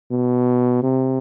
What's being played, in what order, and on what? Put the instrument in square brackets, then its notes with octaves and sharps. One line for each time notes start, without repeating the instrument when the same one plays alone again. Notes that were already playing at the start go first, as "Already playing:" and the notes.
[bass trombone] B2
C3